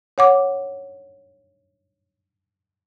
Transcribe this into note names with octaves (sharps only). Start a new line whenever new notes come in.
C#5 F#5 D6